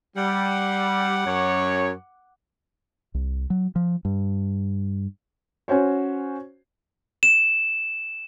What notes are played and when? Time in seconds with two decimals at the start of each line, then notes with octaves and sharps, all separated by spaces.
0.17 G3 F#5 D6
1.26 F#2 C#5
3.14 C2
3.50 F#3
3.76 F3
4.05 G2
5.68 C#4 F#4 C5 C#5
7.23 E7